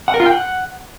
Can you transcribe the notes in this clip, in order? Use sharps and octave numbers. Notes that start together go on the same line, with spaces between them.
F#5
A#4
F4
G5
F#5